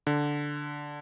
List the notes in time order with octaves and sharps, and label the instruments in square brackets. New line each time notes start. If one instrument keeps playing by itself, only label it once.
[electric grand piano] D3